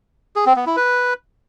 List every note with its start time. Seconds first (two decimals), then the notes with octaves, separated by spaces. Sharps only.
0.36 G#4
0.46 C4
0.56 B3
0.66 E4
0.76 B4